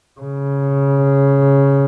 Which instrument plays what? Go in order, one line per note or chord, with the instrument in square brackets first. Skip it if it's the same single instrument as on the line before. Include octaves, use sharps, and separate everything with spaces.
[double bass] C#3